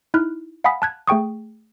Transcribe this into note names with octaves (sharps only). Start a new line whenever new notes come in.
D#4 E4 F6 F#6
F5 F#5 G#5 B5 D#6 B6
A5 F#6 G#6
A3 G#4 G5 C#6 D#6